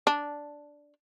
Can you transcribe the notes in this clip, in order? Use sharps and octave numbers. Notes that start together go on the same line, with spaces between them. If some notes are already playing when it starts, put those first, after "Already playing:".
D4